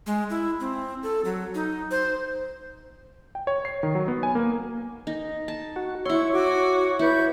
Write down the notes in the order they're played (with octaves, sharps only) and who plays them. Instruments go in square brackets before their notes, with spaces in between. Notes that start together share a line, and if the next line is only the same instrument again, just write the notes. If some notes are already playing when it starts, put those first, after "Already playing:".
[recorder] G#3
E4
C4
A4
F#3
D#4
C5
[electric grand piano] G5
C#5
C7
D#3
F#3
B3
G#5
A#3
[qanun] D#4
A5
[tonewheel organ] F#4
[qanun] E4 C6 [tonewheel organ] C#5 [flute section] E6
[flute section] F#4 D6
[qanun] E4 [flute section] B4 G6